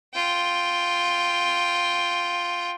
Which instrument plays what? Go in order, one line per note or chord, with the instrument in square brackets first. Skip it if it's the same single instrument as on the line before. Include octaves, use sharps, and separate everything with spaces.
[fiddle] F4 G5